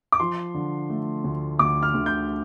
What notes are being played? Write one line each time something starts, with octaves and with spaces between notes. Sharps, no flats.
D6
F3 C6
D3
A3
D2
D2 D6
F6
D2
G6